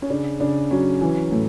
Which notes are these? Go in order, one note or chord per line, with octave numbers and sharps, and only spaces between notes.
C#4
C#3 D4
C#3 D4
F#3 C#4
E3
A2